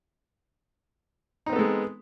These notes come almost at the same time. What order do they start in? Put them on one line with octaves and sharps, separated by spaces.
D#4 C4 B3 A4 G#3